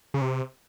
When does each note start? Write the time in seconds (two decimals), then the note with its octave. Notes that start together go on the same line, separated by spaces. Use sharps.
0.14 C#3
0.22 C3